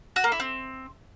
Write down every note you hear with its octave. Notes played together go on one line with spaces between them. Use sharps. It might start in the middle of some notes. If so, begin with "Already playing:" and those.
F#4
A#3
E4
C4